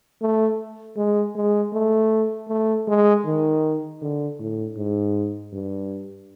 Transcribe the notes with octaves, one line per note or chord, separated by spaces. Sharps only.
A3
G#3
G#3
A3
A3
G#3
D#3
D3
A2
G#2
G2